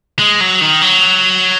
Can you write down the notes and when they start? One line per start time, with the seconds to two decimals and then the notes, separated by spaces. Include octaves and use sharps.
0.19 G#3
0.41 F#3
0.61 D#3
0.81 F#3